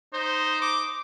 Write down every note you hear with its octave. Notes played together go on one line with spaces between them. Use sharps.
D#4 C5
D6